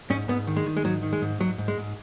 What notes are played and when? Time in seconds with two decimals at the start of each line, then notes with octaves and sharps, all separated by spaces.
0.10 G#2 C#4
0.28 G#2 B3
0.47 D#3
0.57 G#3
0.66 D#3
0.77 G#3
0.84 G#2 F#3
1.03 D#3
1.13 G#3
1.22 G#2
1.40 G#2 F#3
1.58 G#2
1.68 G#3
1.78 G#2